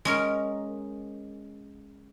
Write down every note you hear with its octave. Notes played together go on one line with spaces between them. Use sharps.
G#3 C#4 A#4